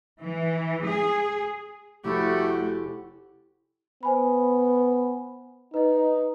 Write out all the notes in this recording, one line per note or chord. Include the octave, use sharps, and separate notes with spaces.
E3
G#4
F1 A3 E4 F#4 G4
B3 C5 G#5 B5
D#4 B4 D#5